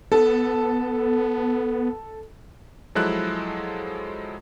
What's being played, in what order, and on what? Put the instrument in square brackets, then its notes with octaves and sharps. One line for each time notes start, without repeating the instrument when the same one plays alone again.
[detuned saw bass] B3 [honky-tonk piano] A4
[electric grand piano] F3 F#3 G#3 E4 A4 F#6